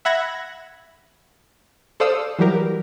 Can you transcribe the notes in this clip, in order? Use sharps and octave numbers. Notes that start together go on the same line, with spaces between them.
E5 F#5 B5 F#6 G#6 A#6
A4 C5 D5 F5 D#6 E6
E3 F#3 G3 G4 A#4